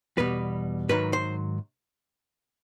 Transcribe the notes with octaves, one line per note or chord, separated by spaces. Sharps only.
E2 B2 G3 B4
G#2 D#3 F#3 B4
C5